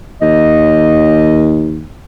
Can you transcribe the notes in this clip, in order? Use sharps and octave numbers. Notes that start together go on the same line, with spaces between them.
D#2 D#5